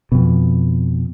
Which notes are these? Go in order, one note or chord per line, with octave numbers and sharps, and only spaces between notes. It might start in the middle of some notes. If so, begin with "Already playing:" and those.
F2 B2